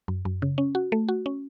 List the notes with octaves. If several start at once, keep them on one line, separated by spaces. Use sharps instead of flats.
F#2
F#2
C#3
C#4
F#4
A3
F#4
C#4